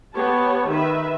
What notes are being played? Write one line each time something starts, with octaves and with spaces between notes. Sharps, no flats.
B3 G4 C#5 A5
D#3 B4 E5